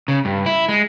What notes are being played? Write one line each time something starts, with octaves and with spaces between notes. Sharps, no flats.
C#3
G2
E4
G#3